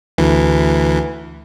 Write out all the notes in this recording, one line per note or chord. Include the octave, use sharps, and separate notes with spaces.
D2 E3